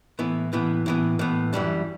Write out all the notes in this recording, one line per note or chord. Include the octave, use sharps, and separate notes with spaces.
A2 E3 B3
A2 E3 B3
A2 E3 B3
A2 E3 B3
F#2 E3 G3 D4